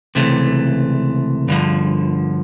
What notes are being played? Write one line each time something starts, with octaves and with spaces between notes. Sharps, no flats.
C#2 C3 E3 A3
G2 D3 F3